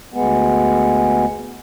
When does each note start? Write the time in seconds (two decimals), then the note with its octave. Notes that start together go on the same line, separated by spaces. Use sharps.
0.14 D2 G#3 B3